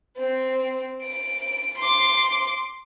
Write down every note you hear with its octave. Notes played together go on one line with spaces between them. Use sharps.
C4
D7
C6 D6